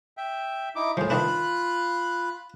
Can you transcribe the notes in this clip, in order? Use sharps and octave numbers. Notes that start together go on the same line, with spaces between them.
E5 G5
D#4 E4 D6
A2 F3 G#4 C5
D#3 E3 D4 F4 B5 F#6